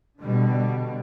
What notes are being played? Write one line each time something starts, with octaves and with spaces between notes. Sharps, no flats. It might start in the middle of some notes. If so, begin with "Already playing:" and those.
B2 D3 G3